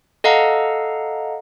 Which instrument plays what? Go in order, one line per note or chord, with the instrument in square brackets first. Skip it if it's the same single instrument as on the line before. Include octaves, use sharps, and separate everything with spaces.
[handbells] A4 D#5 F5 F#5 A#5